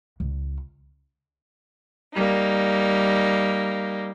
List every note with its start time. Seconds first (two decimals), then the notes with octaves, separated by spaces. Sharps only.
0.20 C#2
2.14 G3 A#3 D#4